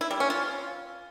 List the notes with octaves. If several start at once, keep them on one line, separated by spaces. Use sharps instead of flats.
E4
G3
C#4
F4